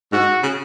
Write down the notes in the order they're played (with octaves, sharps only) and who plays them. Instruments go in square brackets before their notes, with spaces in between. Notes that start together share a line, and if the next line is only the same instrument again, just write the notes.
[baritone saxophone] G#2 [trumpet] F#4
[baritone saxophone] C#3